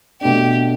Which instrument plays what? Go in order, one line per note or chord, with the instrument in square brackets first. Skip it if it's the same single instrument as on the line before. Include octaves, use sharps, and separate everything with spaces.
[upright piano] B2 A3 D4 [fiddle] G4